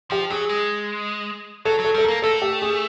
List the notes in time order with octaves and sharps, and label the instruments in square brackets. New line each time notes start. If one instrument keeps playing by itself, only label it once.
[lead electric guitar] F3 [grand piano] G4
[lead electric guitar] F#3 [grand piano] G#4
[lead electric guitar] G#3
[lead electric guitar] F#3 [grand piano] A4
[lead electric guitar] F#3 [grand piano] A4
[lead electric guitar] G3 [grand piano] A4
[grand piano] A#4
[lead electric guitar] A#3
[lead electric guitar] A3 [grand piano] A4
[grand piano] G4
G#4